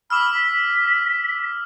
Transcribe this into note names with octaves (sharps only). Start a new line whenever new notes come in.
B5 D6 E6 F6
B6